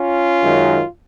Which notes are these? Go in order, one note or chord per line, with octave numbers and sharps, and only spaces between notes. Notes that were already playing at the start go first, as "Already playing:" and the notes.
Already playing: C#4 F4
F#2 D#3 G#3